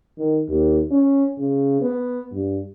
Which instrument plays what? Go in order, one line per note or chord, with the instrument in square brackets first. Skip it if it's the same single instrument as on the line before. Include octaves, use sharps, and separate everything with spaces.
[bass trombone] D#3
D#2
C#4
C#3
B3
G2